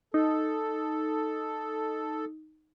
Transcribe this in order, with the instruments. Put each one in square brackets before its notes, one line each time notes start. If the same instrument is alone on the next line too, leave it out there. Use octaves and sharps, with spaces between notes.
[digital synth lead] D#4 [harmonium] A4